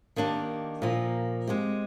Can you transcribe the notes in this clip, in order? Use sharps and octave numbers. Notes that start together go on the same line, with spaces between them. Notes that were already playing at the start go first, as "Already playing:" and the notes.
D#3 A#3 D4 G4
A#2 F3 A#3
G#3 C4 G4